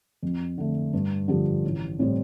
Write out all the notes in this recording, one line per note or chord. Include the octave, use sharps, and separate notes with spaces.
F2
D3 A3
G2
D3 F3 D4 G4
A1
A2 G3 C4